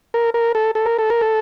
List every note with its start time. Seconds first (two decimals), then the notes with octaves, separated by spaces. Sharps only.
0.14 A#4
0.34 A#4
0.55 A4
0.75 A4
0.86 A#4
0.98 A4
1.10 A#4
1.21 A4